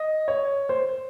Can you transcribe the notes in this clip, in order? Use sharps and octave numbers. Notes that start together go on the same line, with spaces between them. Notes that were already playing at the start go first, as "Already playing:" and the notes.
Already playing: D#5
C#5
C5